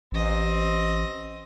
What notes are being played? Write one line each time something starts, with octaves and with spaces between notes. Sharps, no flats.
A1 C4 D#5